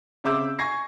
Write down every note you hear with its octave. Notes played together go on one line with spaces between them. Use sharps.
C#3 C4 E5 D6 E6 G6
G#5 C#6 G#6 A#6 C7